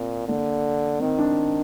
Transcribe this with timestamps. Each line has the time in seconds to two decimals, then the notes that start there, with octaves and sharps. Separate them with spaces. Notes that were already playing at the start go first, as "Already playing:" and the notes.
Already playing: A#2 C4
0.28 D3 A#3
1.00 D#3 C4
1.18 D4